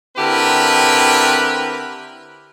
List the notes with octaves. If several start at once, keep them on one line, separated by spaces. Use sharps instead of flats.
D3 C4 E4 G4 A#4 B4